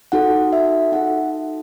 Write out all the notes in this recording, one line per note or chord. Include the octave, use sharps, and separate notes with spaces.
D#4 F#4 A4 F#5
E5
D#4 F#4 A4 F#5